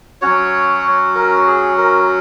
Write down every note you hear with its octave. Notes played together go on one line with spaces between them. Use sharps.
F#3 C#4 F#4 C#5
A#4
G#4
A#4